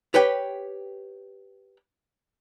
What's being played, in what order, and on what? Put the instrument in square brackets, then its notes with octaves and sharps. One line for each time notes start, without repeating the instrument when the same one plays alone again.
[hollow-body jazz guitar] G4 B4 C#5 G5